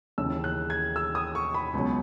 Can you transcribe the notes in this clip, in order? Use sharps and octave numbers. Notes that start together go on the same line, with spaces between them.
D#2 C#3 E3 E6
F#6
G#6
E6
D#6
C#6
B5
C#2 B2 F#3